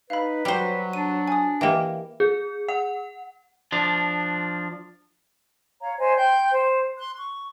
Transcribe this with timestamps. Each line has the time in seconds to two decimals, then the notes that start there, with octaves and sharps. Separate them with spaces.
0.10 D#4 B4 F5 B5
0.45 F#3 G3 C5
0.93 D4 D#7
1.28 G#5 D#6
1.61 E3 A#3 G4 D#5 G5
2.20 G#4
2.68 F#5
3.72 F3 D4
5.80 C#5 F5 A#5
5.99 C5 C#5 D#5 G#5
6.16 G5 C6 G6
6.50 C5
6.97 C6 F#6
7.18 C#6